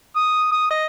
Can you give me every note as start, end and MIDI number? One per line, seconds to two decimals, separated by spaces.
0.16 0.50 87
0.51 0.66 87
0.70 0.85 75